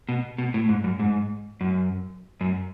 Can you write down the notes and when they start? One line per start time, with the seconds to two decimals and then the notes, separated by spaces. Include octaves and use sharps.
0.09 B2
0.38 B2
0.54 A2
0.69 G#2
0.84 F#2
0.99 G#2
1.61 F#2
2.41 F#2